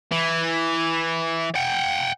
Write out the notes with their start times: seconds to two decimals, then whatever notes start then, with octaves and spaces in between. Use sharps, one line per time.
0.12 E3
1.55 F#5 G5